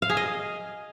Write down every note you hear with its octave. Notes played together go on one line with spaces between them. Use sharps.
F5
G#4
D#5